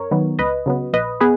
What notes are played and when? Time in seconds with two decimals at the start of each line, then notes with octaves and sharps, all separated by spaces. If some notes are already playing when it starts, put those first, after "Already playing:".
Already playing: F#2 A#4 C#5
0.11 D#3 F#3 B3
0.39 C#2 B4 D#5
0.66 C#3 F#3 B3
0.93 A#1 B4 D#5
1.21 B3 G#4 B4